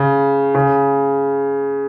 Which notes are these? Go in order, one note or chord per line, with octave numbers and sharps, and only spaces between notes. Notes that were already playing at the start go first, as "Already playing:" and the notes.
Already playing: C#3
C#3